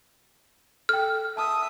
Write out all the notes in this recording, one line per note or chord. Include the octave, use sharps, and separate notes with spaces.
A4 G5 F6
E5 A5 D#6